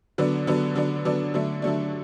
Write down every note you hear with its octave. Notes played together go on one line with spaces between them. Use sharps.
D3 F#3 B3 D4
D3 F#3 B3 D4
D3 F#3 B3 D4
D3 F#3 B3 D4
D3 F#3 A3 D4
D3 F#3 A3 D4